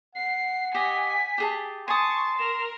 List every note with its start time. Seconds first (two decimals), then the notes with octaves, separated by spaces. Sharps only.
0.15 F#5 C7
0.74 G4 D#5 G#5 B6
1.38 G4 G#4 A5
1.88 G#5 A5 C6 C#6 D#6
2.38 A#4 E7